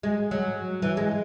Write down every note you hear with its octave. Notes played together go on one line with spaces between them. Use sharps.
G#3
F#3
E3
G#3